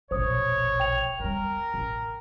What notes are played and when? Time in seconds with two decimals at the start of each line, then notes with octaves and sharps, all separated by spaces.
0.11 E1 A#1 C5 C#5 D#6
0.80 G5 F7
1.20 E2 G3 A#4
1.74 A1